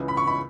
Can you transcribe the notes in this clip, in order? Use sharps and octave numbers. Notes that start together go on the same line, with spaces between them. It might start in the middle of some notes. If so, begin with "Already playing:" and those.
Already playing: C#2 C#3 E3
B5
C#6
B5